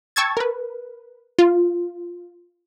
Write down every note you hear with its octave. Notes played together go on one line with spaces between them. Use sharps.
G5 A5 C#6 E6 G#6 A6
A#4 B4
F4